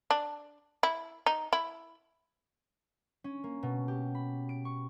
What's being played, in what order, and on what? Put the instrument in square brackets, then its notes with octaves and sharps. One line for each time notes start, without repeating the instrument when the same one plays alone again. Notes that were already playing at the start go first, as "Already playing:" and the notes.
[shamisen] D4
E4
D#4
E4
[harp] C#4
A#3
B2
G4
B5
D7
C#6